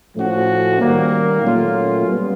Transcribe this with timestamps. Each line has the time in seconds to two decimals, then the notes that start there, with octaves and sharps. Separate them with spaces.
0.14 A2 F3 A3 C#4 F#4
0.78 D#3 G3 A#3
1.41 A#2 F#3 A3 C#4 F4
2.05 G3 B3